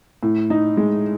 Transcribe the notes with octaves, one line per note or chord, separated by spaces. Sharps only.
A2
D#4
G#3